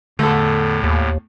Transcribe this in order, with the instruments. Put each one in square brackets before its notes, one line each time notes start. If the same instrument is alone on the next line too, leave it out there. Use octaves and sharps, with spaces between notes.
[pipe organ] E2 A2 [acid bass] D3 [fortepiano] A3 A4
[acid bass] D#2